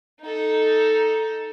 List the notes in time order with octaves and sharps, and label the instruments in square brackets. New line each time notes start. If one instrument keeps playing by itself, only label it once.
[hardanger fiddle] D#4 A4